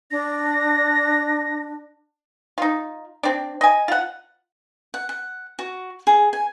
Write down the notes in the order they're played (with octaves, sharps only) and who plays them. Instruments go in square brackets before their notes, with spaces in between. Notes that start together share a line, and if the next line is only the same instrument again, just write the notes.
[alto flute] D4 [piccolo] A#6
[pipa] D#4 F4
C4 D4
D#5 G#5
F4 F#5
[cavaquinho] F#5
F#5
F#4
G#4
G#5